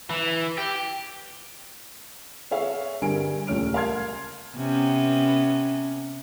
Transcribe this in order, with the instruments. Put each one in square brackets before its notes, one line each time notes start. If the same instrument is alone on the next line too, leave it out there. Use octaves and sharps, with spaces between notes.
[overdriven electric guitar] E3
G4
[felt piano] G#4 C#5 E5 F5
G2 D3 G3 A#4 G#5 D7
D#1 C#2 A3 C#4 F6 D7
A#4 F5 A5 C6 F6 G#6
[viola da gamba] C3 B3 C#4